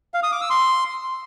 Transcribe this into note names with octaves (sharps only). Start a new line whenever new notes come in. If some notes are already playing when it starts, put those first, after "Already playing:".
F5
D#6
D6
E6
C6